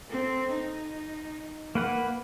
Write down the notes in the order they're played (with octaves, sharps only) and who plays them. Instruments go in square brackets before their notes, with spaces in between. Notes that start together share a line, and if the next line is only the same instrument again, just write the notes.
[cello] C4 A4
D#4
[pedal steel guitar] A#3 B4 F#5